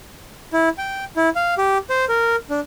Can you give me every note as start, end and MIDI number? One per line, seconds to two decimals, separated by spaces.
0.53 0.69 64
0.78 1.05 79
1.16 1.29 64
1.36 1.54 77
1.58 1.78 67
1.90 2.05 72
2.09 2.36 70
2.50 2.60 62